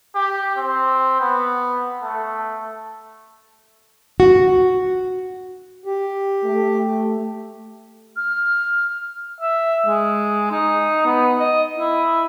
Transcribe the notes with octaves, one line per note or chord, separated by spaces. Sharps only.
G4
C4
B3
A3
F#4
G4
A3
F6
E5
G#3
D#4
B3
D#5
E4